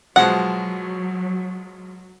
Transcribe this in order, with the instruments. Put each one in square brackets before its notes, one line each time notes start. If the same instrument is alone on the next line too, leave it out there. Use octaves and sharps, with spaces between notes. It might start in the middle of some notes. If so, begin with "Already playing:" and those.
[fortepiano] B2 F3 G#3 [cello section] F#3 [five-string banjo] F#5